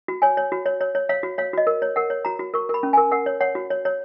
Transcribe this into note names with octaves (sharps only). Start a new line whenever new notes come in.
F#4
C#5 G#5
C#5
F#4
C#5
C#5
C#5
C#5 F5
F#4
C#5 F5
F#4 D#5
A#4
C#5
A#4 F#5
C#5
F#4 A#5
F#4
A#4 C#6
A#4 B5
C#4
A#4 G#5
A#4 F#5
C#5
C#5 F#5
F#4
C#5
C#5